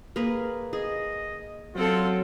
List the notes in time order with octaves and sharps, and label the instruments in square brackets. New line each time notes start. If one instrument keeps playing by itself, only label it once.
[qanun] A#3 G#4 B4
[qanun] G#4 [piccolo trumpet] D#5
[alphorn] F#3 [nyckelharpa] C4 A4 [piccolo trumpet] F4